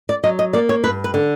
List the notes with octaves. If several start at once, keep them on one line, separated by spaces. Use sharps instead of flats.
D5
F#3 D#5
D#5
A#3 D5
C#5
G2 B4
B4
D3